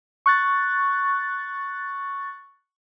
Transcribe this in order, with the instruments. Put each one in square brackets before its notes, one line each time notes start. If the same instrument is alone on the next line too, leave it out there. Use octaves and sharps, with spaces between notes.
[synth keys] C#6 F#6 A6